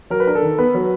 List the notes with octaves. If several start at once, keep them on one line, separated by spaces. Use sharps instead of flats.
F#3 A#4
B4
D4 A#4
A4
D#3
B3 B4
F#3